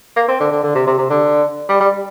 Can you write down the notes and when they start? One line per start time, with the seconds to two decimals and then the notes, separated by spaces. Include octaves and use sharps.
0.16 A#3
0.28 C4
0.40 D3
0.51 D3
0.63 D3
0.75 C3
0.87 C3
0.98 C3
1.10 D3
1.69 G3
1.80 G3